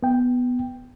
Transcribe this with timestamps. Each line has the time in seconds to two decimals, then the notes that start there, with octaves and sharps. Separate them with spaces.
0.03 B3 G5